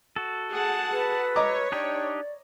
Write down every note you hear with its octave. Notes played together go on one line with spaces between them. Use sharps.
F#4 A4
G#4 F#5 A5
B4
C#5 D#5 A#5 D6
D4 D#4 G4 D5